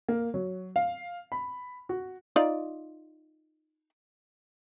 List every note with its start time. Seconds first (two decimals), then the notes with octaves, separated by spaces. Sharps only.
0.08 A#3
0.34 F#3
0.76 F5
1.32 B5
1.89 F#4
2.36 D#4 F4 D5